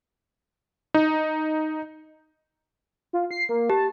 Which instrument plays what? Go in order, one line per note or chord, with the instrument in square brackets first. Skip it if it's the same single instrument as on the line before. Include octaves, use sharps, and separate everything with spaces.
[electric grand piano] D#4
[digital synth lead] F4
C7
A#3
[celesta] G4 [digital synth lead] A5